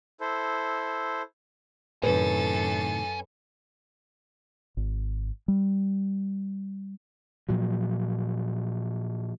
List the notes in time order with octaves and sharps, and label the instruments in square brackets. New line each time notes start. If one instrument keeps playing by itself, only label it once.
[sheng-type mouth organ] E4 A4 C5
[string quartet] F#2 A4 A6 [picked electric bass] A2 C3 D#3 [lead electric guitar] C#4 [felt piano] B4
[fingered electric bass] G#1
G3
A#2 F3 F#3